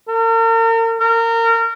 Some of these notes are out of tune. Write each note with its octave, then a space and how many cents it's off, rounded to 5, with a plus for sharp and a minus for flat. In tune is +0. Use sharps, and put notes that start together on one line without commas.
A#4 -40
A#4 -25